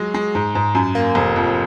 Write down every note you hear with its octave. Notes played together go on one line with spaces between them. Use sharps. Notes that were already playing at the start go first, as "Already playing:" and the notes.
Already playing: F#3 G#3
G#3
G#2
G#2
F#2
A#3
F1
F2